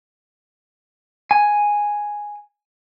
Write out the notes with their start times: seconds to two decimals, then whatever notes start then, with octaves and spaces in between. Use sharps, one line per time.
1.31 G#5